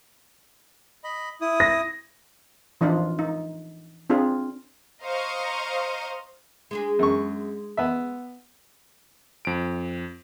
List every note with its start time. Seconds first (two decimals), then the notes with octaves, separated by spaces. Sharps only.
1.04 D#5 B5
1.41 E4 D#6
1.60 A#6
2.81 E3 F3 D4 D#4 F4
3.19 D#4
4.10 C4 D4 F4 G#4
5.03 C5 D#5 F5 A#5 C#6 D#6
6.71 G#3 D4 G#4
6.99 F#2 C#6
7.77 B3 E5
9.45 F2 D7